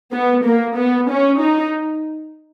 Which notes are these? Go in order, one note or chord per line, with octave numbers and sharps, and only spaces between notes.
B3
A#3
B3
C#4
D#4